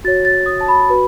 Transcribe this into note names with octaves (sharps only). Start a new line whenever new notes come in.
F#4 C#5 A6
A6
D#6
A5
B5
F#4 B4